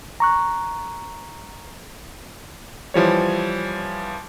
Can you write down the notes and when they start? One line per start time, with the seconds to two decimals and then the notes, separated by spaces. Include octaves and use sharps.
0.20 A#5 C#6 F#6
2.94 E3 F3 G3 C#5